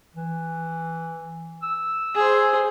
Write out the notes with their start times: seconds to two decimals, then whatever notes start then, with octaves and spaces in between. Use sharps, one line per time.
0.15 E3
1.63 E6
2.16 G#4 C5